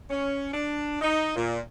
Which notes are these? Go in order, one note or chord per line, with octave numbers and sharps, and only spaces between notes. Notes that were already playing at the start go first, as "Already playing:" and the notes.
C#4
D4
D#4
A#2